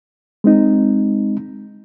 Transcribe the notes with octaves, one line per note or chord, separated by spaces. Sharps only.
G#3 C4 D#4